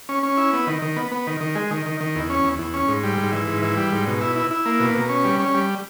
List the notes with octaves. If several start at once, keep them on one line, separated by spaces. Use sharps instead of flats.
C#4
C#4
E4
B3
D#3
D#3
B3
B3
D#3
D#3
G#3
D#3
D#3
D#3
E2
C#4
E2
E2
C#4
G#2
G3
G#2
E3
G#2
E3
G3
G#2
B2
E4
E4
E4
A#3
B2
B2
C#4
G3
C#4
G3